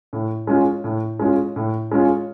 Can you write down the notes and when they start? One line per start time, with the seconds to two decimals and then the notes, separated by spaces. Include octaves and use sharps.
0.13 A2
0.47 G#3 C#4 F4
0.84 A2
1.20 G#3 C#4 F4
1.56 A2
1.92 G#3 C#4 F4